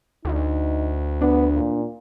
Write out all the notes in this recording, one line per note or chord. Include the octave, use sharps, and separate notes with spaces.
D2 D#4
B3 D4
A#2